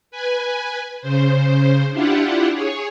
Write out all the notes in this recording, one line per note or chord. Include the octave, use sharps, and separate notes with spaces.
B4 G#5
C#3 C5
D4 E4 F4 G4 F#5
G#4 C#5